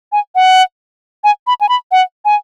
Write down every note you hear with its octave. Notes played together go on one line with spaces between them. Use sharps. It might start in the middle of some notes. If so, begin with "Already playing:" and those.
G#5
F#5
G#5
B5
G#5
B5
F#5
G#5